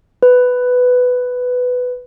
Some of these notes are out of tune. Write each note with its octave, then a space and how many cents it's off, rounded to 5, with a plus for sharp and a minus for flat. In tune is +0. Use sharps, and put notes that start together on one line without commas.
B4 +10